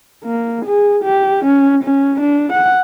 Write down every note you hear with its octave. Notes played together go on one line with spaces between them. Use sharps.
A#3
G#4
G4
C#4
C#4
D4
F#5